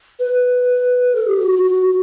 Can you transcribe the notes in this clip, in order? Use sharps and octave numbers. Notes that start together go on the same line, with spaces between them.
B4
A4
G4
F#4
F#4
F#4
F#4